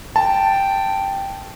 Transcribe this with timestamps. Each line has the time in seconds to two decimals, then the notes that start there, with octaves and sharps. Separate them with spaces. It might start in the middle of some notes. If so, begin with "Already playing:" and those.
0.16 G5 A5